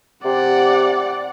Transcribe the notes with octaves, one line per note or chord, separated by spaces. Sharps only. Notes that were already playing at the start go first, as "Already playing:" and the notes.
C3 D5 F#5